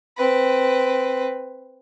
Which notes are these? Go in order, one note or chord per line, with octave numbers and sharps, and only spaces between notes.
C4 B4